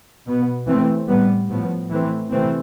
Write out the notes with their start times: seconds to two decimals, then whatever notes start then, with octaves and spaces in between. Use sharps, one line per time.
0.26 B2 B3
0.68 E3 A3 C4
1.08 A2 G3 B3
1.50 A2 F3 B3
1.90 E3 A3 C4
2.31 C3 E3 A3 C4